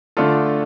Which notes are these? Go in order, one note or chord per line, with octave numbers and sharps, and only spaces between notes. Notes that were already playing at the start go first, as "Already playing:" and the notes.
D3 A3 D4 F4 A4